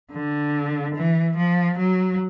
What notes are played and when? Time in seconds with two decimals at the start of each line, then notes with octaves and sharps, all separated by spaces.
0.12 D3
0.95 E3
1.36 F3
1.77 F#3